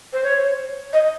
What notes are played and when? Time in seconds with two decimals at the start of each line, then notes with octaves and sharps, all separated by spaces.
0.13 C5
0.24 C#5
0.93 D#5